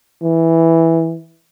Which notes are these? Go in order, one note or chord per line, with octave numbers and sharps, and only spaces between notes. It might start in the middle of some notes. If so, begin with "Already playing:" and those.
E3